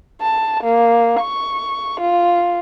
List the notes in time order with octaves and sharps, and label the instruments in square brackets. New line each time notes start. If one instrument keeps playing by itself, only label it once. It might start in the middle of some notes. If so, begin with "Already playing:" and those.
[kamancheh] A5
A#3
C#6
F4